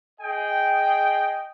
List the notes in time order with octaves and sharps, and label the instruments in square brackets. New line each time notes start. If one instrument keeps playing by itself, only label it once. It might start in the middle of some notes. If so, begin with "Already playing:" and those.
[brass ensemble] G#4 D#5 G5